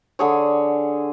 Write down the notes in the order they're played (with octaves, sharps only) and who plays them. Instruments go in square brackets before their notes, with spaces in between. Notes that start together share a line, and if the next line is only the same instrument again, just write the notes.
[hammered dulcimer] D3 G#4 C#5